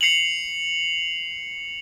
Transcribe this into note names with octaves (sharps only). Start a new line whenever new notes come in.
C7 C#7 F7 F#7